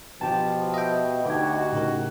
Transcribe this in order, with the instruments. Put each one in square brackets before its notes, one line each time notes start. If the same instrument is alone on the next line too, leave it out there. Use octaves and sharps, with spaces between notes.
[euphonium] B2 [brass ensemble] F3 [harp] G4 A5
[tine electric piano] D#5 E5 G5
[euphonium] D2 [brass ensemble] D#4 F#4 [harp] G4 G#6
[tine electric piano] A2 C#3 A#4